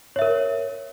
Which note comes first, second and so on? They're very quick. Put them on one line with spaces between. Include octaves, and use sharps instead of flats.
C#5 E5 A#4